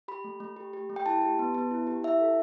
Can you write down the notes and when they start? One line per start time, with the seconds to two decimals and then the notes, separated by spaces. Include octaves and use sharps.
0.08 G4 B5
0.24 A3
0.40 A3
0.56 G4
0.73 G4
0.89 A3
0.96 G5
1.06 E4 A5
1.22 G4
1.39 B3
1.54 B3
1.71 E4
1.87 G4
2.03 E4 E5
2.20 A4